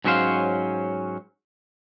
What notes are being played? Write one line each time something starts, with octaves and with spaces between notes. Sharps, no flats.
G#2 F#3 C#4 D#4 C5 F5